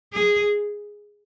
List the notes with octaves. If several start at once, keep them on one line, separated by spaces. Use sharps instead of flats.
G#4